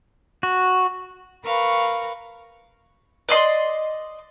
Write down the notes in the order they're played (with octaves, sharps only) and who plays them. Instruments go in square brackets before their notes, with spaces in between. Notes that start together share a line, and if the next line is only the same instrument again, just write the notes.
[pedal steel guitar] F#4
[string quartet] A#4 B4 F5 C#6
[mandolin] D5 D#5 C6